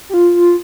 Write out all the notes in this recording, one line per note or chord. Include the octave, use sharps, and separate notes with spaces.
G4
F4